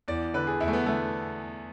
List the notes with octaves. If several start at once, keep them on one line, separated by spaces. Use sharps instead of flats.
E2 D5
D3 B4
G#4
E2 E4
A3
B3
D3 A3